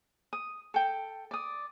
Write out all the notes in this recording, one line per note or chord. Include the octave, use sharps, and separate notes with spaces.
D#6
A4 G5
D5 D#6